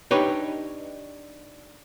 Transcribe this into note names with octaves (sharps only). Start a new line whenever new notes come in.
D4 D#4 G4 B4 C#5